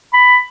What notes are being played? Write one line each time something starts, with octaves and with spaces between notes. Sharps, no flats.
B5